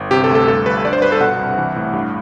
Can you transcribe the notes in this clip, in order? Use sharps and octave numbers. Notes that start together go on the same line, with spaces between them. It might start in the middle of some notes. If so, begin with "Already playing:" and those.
Already playing: G1
C3 G4
A4
D2
A4
G2 A4
G1 B4
D3 D5
C5
G2 B4
A4
B2 F#5
C2
E3
A2
G2